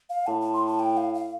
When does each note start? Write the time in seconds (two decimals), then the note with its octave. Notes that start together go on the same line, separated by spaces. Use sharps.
0.10 F5
0.27 A2 A5
0.41 A5
0.53 C6
0.67 A5
0.79 G5
0.97 F5
1.14 F5